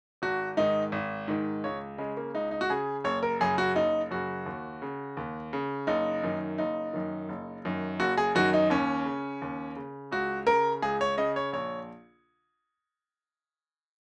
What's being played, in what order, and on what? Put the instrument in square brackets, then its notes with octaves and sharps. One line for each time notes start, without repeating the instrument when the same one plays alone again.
[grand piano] G#1 F#4
G#2 D#3 D#4
G#1
G#2 D#3
C#2 C#5
C#3 G#3
A#3
C#2 D#4
D#4
F#4
C#3 G#4
F#1 C#5
A#4
F#2 C#3 G#4
F#4
F#1 D#4
F#2 C#3 F#4
D#2
C#3
D#2
C#3
F#1 D#4
F#2 D#3
F#1 D#4
F#2 D#3
F#1
F#2 D#3
F#1 F#4
G#4
F#2 D#3 F#4
D#4
D#2 C#4
C#3
D#2
C#3
C#2 F#4
C#3 A#4
C#2 G#4
C#5
C#3 D#5
C#5
A#1 C#5